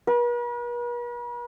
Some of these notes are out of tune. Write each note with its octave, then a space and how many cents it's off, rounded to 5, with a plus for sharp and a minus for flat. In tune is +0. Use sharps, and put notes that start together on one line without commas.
B4 -45